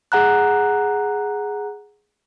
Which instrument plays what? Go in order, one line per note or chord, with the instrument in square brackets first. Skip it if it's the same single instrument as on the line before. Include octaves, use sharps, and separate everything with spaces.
[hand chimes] G#4 F#5 A#5 F#6